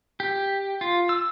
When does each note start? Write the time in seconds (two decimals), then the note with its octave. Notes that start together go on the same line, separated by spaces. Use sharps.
0.20 G4
0.81 F4
1.09 E6